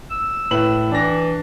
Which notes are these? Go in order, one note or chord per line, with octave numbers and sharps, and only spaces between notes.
E6
A2 B4 F#7
E3 D4 A#6